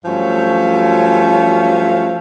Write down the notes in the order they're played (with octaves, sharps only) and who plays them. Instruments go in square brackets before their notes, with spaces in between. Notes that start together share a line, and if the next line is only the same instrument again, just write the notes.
[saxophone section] G2 F3 F#3 A3 C#4 F5